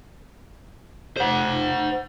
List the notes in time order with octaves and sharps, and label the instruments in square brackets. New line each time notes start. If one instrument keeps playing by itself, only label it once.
[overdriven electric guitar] C5 F#5